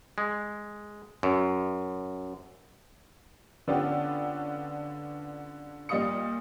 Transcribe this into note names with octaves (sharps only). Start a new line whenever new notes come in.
G#3
F#2
D3 B3 C#4 D4 F4 G4
A#2 G3 D#5 F5 D#6 C#7